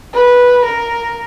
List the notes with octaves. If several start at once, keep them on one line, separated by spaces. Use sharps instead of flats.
B4
A#4